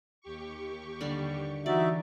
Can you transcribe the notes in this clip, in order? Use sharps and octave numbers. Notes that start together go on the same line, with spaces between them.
D#2 G4 C#6
D3 G3 D4
E3 D#4 F#4 D5 E5